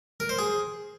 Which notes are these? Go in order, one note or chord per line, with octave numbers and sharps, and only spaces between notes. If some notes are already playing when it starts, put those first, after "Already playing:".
A#4
C5
G#4